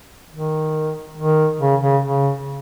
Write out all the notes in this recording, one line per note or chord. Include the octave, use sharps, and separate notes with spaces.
D#3
D#3
C#3
C#3
C#3